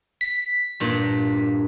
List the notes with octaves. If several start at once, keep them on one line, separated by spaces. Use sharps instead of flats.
B6
G2 A#2